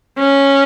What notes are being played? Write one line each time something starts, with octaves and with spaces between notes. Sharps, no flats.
C#4